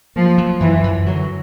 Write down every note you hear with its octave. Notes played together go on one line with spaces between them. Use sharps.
F3 A#3
F#3
F#2 E3
F#2
D3 F#3